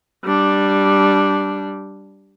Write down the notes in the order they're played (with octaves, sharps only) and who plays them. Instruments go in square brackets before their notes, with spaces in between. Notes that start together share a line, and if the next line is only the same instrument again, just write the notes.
[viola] G3 D4